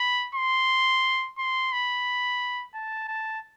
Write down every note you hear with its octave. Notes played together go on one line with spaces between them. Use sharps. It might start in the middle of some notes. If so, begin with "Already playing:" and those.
Already playing: B5
C6
C6
B5
A5
A5